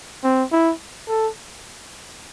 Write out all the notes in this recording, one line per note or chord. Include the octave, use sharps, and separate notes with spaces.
C4
E4
A4